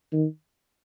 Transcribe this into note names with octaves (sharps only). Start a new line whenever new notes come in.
D#3